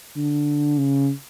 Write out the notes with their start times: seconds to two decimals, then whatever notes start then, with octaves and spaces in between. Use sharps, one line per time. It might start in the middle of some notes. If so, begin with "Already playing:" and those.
0.16 D3
0.78 C#3